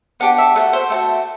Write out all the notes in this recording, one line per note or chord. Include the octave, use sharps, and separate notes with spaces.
B3 D4 G4 F#5
E5
A3 D4 F#4 F#5
C5
A3 D4 F#4